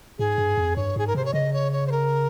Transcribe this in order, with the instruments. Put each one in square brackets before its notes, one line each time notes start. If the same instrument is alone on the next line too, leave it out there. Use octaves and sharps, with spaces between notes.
[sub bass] G#2 [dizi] G#4
[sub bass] G2
F2
[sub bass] G2 [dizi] C#5
[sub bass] G#2 [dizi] G#4
[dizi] A#4
[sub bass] C3 [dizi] C5
[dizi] C#5
[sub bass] C#3 [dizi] D#5
[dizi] C#5
C#5
C5
A#4